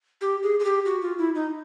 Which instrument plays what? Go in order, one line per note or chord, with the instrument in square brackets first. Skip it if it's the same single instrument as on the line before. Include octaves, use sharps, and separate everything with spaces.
[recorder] G4
G#4
G#4
G4
F#4
F4
E4
D#4